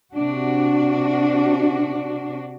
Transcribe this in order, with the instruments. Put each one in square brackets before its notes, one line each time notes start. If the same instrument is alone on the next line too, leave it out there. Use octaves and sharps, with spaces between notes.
[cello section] C3 D4 F#4